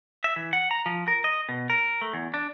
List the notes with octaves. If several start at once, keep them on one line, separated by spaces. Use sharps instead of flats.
E5
E3
F#5
A#5
F3
A#4
D#5
B2
A#4
A3
E2
D4